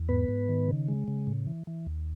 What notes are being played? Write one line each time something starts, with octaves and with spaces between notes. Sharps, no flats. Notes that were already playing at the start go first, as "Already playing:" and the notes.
Already playing: E2
G#2 B3 B4
G#2
D#3
C#3
G#3
C#3
A2
E3
E3
D#2